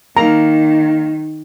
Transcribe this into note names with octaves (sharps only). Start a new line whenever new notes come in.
D#3 A#3 A#5